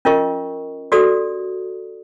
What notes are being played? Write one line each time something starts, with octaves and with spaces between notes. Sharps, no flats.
C#4 F4 A#4 D#5 C#6
F#4 G4 A4 D5 D#6